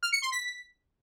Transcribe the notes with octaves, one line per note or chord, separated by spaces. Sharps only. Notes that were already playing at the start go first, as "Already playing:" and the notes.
F6
C#7
C6
B6